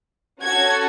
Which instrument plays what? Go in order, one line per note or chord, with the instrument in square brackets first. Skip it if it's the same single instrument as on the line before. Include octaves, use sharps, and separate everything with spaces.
[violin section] C#4 F#4 A4 G#6